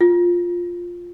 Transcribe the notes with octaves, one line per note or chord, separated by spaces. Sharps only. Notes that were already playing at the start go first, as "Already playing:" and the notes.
F4